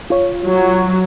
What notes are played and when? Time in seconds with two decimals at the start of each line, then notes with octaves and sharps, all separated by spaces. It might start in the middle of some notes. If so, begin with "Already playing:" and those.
0.10 F4 C#5
0.46 F#3